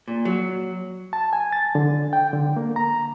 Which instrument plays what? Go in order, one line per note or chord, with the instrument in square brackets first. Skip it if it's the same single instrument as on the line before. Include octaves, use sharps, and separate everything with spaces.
[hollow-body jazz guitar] A#2
F#3
[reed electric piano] A5
G#5
A6
D3
G5
D3
A#3
A#5